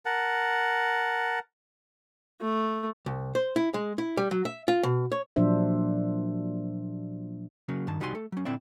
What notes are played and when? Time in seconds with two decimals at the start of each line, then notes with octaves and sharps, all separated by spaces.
0.06 A#4 F#5 A5
2.41 A3
3.06 C2
3.35 C5
3.56 E4
3.74 G#3
3.98 E4
4.17 G3
4.31 F#3
4.45 E5
4.68 F4
4.83 B2
5.12 C#5
5.36 A#2 F3 F#3 D4 C5 E5
7.68 C#3 F#3 A#3
7.87 G2 D#3 A5
8.00 C2 G3 D#4 F#4 G#5 C6
8.15 A3 A4
8.32 F#3 C#4
8.45 A#2 D3 C4 E4 D5 E5